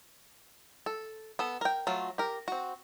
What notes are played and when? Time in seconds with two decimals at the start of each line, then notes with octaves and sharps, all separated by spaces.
0.86 A4
1.39 B3 A4
1.61 A#4 G5
1.87 F#3 A3 F4
2.18 G4 A#4
2.48 C4 F#4